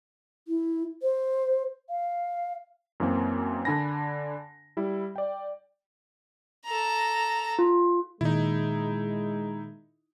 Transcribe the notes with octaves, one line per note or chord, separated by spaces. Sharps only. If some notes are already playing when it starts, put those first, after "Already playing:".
E4
C5
F5
F#2 E3 A#3 C4
D3 D4 G#5 B5 A#6
G3 E4
D5 G5
A4 A#5
F4
A#2 D#3 G#3 D#4 E4